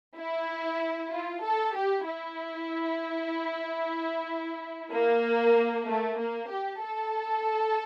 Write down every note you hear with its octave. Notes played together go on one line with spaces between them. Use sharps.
E4
F4
A4
G4
E4
A#3
A3
A#3
G4
A4